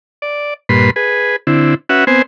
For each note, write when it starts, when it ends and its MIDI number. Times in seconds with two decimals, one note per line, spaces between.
0.22 0.54 74
0.69 0.90 43
0.69 0.90 46
0.69 0.90 71
0.69 0.90 83
0.69 0.90 84
0.96 1.36 68
0.96 1.36 71
1.47 1.75 50
1.47 1.75 60
1.47 1.75 64
1.89 2.05 61
1.89 2.05 66
1.89 2.05 71
1.89 2.05 76
1.89 2.05 78
2.07 2.22 59
2.07 2.22 60
2.07 2.22 72
2.07 2.22 80